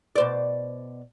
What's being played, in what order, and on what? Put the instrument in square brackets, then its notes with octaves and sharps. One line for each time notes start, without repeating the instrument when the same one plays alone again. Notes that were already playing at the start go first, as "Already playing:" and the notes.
[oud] B2 C5 D5